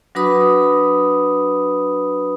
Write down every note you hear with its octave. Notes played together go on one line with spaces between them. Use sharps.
F#3 D4 F#4 B4 B5 D#6